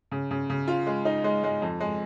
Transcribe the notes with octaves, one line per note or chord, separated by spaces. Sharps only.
C#3
C#3
C#3
F4
G#3
D#4
G#3
G#3
F2
G#3